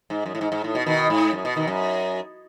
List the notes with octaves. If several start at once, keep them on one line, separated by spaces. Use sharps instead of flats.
G#2
F#2
A2
G#2
G#2
A2
B2
B2 D#3
G#2
F#2
B2
B2 D#3
F#2